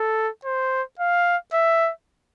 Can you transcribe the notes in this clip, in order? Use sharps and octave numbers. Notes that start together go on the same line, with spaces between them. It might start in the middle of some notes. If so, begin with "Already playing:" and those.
Already playing: A4
C5
F5
E5